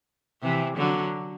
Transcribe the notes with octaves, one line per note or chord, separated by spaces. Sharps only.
C3 E3
D3 F#3